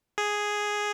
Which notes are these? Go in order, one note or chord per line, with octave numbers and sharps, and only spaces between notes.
G#4